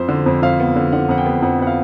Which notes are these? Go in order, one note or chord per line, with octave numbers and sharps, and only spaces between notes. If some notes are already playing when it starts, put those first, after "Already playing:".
Already playing: F2 C5
D3
F2
F2 F5
B3
D3
D3 F#5
F2 F#5
G5
B3
F2 F#5
B3 F#5
F5